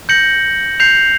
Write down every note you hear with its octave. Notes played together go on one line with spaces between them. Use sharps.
G6 A#6 C#7 F#7
G6 C7 F7